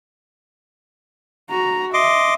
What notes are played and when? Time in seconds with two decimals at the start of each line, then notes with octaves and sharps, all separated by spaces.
1.50 F#4 A#5
1.94 D#5 E5 C6 D6